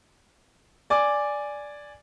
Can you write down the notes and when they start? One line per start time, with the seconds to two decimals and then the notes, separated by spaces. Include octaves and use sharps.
0.90 D5 G#5 D6